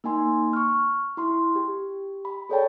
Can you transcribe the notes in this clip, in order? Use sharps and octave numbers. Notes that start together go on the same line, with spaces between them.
A#3 D#4 G#5 C6
C#6 F6
E4 C6
G4
B5
G#4 A4 C#5 D5 G5 A5